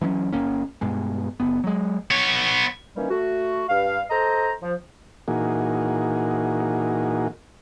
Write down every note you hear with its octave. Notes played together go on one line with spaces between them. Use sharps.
E3 F#3 B3 C#4
G1 G#2 A#3 C#4
G2 B2 G#3
F#1 B3
F#3 G#3
B3 C#5
D#3 E3 G3 A#3 C#4
A3 F#4
G2 F5
A4 C5 D#5 A#5
F3
A#2 E3 A#3 D#4 F#4 G#4